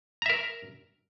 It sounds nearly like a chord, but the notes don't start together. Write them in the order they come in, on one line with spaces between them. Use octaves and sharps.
A#5 E5 A#4